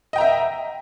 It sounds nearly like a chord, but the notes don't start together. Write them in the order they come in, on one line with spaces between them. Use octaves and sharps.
D#5 G5 A#5 E5